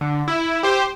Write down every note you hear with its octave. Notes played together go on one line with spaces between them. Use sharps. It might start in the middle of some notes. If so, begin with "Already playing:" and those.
D3
E4
G4 C5